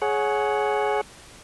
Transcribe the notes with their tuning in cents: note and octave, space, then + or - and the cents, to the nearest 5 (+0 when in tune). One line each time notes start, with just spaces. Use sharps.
G#4 +20 C#5 +0 F#5 +0